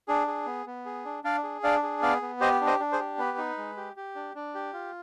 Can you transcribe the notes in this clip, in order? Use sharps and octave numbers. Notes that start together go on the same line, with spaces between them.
D4 G#4
G#4
B3
B3
G#4
D4
D4 D5 F5
G#4
D4 D5 F5
G#4
B3 D5 F5
B3
G4 C5 D#5
D4
C5 D#5
D4
G#4 C5
G4
B3 B4
D#4
G#3
G4
G4
D4
D4
G4
F4